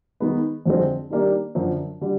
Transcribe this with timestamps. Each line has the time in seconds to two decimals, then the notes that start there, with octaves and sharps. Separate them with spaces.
0.20 D#3 G#3 B3
0.66 F2 D3 F3 G#3 C4
1.10 D#3 G3 A#3 D4 G4
1.55 F#2 D3 F3
2.01 D3 G3